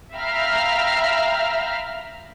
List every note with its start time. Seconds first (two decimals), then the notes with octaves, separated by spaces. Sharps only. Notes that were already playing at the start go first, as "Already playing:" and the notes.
0.14 E5 F5 G5 A#5 B5 F6